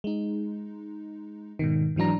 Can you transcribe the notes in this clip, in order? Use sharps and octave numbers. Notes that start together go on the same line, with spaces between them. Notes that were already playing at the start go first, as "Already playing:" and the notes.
G#3 D#4
G#2 B2 D#3
G#2 E3 F#3 D4 A#5